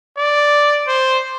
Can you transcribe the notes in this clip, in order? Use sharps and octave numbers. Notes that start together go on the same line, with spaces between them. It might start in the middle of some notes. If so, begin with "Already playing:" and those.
D5
C5